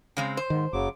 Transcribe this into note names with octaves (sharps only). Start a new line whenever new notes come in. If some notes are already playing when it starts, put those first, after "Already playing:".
C#3 G#3 C4
C5
G#2 D#3
F#1 C#3 F#3 D6